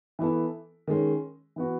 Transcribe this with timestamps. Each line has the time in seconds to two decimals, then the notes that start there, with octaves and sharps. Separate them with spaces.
0.19 E3 B3 E4 A4
0.87 D#3 G#3 C#4
1.56 E3 B3 F#4